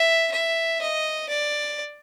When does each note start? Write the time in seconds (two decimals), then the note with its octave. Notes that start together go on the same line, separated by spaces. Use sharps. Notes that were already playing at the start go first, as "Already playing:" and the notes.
Already playing: E5
0.32 E5
0.82 D#5
1.29 D5